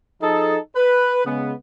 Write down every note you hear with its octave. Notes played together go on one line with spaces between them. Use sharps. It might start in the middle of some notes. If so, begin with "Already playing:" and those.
F3 D#4 G#4 A4
B4
C#3 G#3 B3